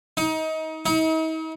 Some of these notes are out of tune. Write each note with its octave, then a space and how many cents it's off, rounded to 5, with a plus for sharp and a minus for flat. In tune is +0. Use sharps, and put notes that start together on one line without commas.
D#4 +30
D#4 +45